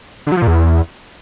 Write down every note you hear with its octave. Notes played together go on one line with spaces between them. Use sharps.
D3
F#3
F3
A#2
E2